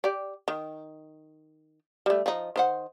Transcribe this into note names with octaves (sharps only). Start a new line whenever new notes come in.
G4 D5
D#3
G3 A3
F3 D#4
D#3 C5 F#5